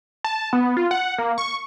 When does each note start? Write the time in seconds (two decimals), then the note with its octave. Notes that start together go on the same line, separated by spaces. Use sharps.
0.24 A5
0.53 B3
0.77 F4
0.91 F#5
1.18 A#3
1.38 C#6